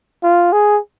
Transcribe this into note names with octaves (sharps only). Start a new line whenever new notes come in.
F4
G#4